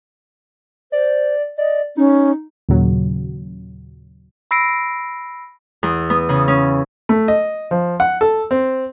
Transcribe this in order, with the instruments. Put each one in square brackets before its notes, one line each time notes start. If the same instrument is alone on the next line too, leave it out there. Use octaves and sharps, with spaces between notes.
[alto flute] C5 [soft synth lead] D5
[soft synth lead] D5 [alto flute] D#5
[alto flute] C#4 [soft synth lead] D#4
[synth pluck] D#2 A#2 C#3 F#3
[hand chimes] B5 E6 A#6 C7 D7
[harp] E2
B3
C#3
C#4
[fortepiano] A3
D#5
F3
F#5
A4
C4